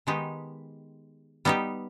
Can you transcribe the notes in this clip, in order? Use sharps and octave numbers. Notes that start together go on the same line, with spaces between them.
D#3 G#3 B3 D#4 G4
G3 B3 D#4 G4